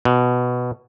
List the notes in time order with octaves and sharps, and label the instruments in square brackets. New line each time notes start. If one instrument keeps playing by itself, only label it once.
[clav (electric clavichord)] B2